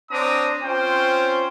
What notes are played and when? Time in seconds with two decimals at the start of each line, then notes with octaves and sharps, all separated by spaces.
0.11 C4 D4 C#5 A#5 D6 D#6
0.64 C4 C#4 F4 C5 C#5 G5